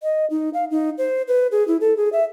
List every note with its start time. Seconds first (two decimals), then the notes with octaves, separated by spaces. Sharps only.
0.03 D#5
0.30 D#4
0.54 F5
0.71 D#4
0.98 C5
1.28 B4
1.52 G#4
1.68 E4
1.81 A4
1.97 G#4
2.13 E5